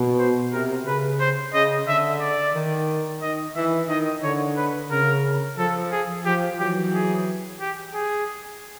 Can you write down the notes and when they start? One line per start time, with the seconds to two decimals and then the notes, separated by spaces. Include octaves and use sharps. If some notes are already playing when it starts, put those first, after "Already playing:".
Already playing: B2
0.19 C5
0.52 C3 A#4
0.85 C#3 B4
1.20 C5
1.54 C#3 D#5
1.87 D3 E5
2.21 D5
2.54 D#3
3.21 D#3 D#5
3.56 E3 E5
3.89 D#3 D#5
4.23 D3 C#5
4.57 B4
4.91 C#3 A#4
5.58 F3 A4
5.92 G#4
6.25 F3 G4
6.59 E3 F#3 G4
6.93 G#4
7.61 G4
7.94 G#4